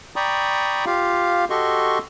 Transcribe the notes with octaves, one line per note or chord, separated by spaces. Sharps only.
D5 G5 A#5 B5 C#6 D#6
F4 G4 F5
F#4 G4 A4 D#5 C6 C#6